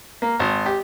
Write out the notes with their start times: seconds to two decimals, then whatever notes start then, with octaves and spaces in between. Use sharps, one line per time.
0.22 A#3
0.39 G#1
0.66 G4